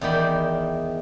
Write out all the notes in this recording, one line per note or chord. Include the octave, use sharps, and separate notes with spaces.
E2 D#3 D5 G5 B5